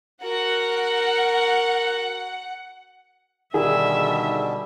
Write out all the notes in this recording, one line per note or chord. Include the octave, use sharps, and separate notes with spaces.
F#4 A#4 F#5
B2 D3 D#3 G3 G#4 E5